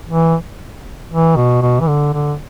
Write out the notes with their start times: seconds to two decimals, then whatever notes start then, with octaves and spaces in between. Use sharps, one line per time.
0.08 E3
1.11 E3
1.36 B2
1.62 B2
1.80 E3
1.87 D3
2.14 D3